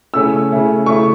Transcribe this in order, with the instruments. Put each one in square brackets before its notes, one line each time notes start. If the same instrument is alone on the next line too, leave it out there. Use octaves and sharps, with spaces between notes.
[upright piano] C#3 A3 C#4 E4 E6
C#3 A3 C#4 E4
C#3 A3 E4 C#6